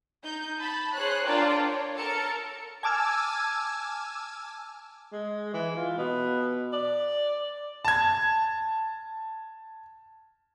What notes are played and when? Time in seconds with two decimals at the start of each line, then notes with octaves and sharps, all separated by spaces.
0.24 D#4 G6
0.59 A5 B5
0.95 G#4 C5 C#5 F#6
1.25 D4 F4 A#4 D5 G5 A5
1.62 C#5
1.98 A4 A#4 C#7
2.83 G#5 A5 D6 E6 F6 G#6
5.13 G#3
5.54 E3
5.76 F4
5.98 B2
6.73 D5
7.85 A5 G#6